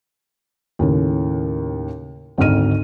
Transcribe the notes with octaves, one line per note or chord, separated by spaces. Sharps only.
D#2 A2 C#3
G#1 D2 G#2 D#4 F6 D#7